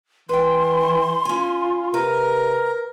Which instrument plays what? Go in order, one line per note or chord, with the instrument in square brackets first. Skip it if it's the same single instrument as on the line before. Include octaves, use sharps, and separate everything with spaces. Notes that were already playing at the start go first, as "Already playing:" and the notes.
[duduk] E3 [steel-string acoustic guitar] B4 G5 [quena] C6
[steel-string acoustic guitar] C#4 G#5 [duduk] F4
[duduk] C3 [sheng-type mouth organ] A#4 [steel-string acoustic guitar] B4